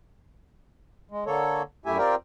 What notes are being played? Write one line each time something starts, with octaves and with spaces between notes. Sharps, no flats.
G#3
D3 A#3 A4 C#5
F#2 A3 E4 G4 E5 G#5
C4 F4 G4 A#4 D5 G5